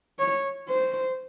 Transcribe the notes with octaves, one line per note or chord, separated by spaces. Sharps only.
C#5
C5